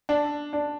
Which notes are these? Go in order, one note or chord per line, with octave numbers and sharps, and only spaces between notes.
D4
D4